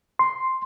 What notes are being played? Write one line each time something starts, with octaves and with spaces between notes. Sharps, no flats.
C6